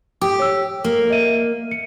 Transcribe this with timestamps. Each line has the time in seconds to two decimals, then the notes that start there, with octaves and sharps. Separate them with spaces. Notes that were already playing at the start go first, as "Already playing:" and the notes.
0.21 G4 D6 D#6
0.39 C#5 E6
0.84 A#3
1.10 D#5 E5 D#7
1.71 C#7